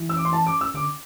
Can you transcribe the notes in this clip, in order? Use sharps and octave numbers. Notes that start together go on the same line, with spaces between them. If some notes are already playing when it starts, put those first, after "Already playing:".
Already playing: E3
E6
D6
C6
A5
D6
E6
D3 D6